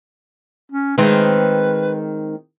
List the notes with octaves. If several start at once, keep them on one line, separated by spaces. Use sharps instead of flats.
C#4
D#3 G#3 C4 B4